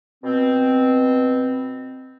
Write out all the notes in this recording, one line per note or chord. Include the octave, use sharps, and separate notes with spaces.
B2 C4